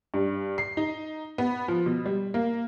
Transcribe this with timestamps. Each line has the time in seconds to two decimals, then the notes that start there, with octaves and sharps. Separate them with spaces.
0.14 G2
0.58 C7
0.77 D#4
1.38 B3
1.68 F3
1.86 B2
2.06 G3
2.34 A#3